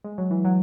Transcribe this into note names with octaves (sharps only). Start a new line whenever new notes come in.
G#3
F#3
E3
F#3